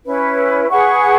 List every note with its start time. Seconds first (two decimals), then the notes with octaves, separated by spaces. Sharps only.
0.05 C#4 E4 B4
0.69 G#4 B4 F#5 C#6